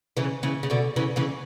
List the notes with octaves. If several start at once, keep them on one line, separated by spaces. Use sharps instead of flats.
C#3 E3
C#3 E3
C#3
B2 D3
C#3 E3
C#3 E3